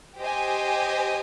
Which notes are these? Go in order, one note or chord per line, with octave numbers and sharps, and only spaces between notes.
G4 C5 D#5 G#5